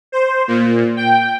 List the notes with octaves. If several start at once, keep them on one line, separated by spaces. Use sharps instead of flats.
C5
A#2
G5